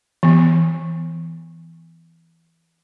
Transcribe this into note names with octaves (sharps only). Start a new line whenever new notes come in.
E3 B3